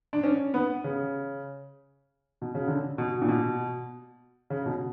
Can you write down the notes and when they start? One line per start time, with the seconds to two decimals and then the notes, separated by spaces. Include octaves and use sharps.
0.13 D4
0.24 C#4
0.54 B3
0.84 C#3
2.42 B2
2.55 C#3
2.68 D3
2.98 B2
3.22 A#2
3.28 B2
4.50 C#3
4.66 B2